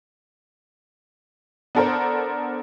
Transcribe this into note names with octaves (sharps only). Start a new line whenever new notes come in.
B3 D4 A4 A#4 C5